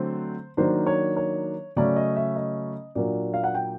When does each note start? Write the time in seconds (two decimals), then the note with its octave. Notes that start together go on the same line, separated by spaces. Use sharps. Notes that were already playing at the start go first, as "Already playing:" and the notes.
Already playing: D3 F#3 A3 C4 C5
0.57 D#3 F#3 A#3 D4 C5
0.87 C#5
1.17 C#5
1.76 C#3 F#3 A3 C#4 D5
1.96 D#5
2.16 E5
2.36 D#5
2.95 A#2 F#3 A#3 D4 D5
3.34 F5
3.44 F#5
3.54 G5